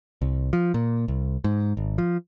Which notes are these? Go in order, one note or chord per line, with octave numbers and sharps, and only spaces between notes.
C2
F3
A#2
C2
G#2
G#1
F3